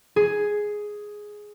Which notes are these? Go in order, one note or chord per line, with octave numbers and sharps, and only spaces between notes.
G#4